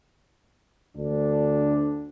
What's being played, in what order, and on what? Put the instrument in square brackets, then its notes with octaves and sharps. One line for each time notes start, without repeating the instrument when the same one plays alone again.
[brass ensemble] D2 D4